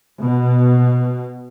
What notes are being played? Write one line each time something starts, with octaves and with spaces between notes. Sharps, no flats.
B2